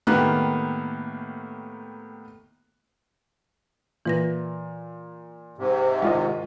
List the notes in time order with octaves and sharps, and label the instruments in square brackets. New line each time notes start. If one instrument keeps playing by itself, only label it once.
[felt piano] A2 D#3 A#3 B3 G4 F#6
[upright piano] A#2 [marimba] E3 B4 A#6
[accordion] G#2 C3
[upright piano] G#1 F4 D#5 [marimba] G#3